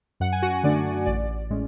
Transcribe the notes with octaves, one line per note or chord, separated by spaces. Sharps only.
F#2 F#5
G#5
F#4 F#5
D3 A3 D4 D5
A1 D5
A2 G#3 C#4